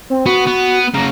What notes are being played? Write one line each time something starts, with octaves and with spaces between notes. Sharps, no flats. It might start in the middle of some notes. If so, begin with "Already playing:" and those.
C4
B3 F#4
B3
C#3 F#3 A#5